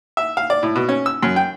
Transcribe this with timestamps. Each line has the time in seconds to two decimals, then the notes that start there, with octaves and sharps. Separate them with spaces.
0.17 E5
0.37 F5
0.50 D5
0.63 A2
0.76 B2
0.89 C#4
1.06 E6
1.23 F#2
1.36 G5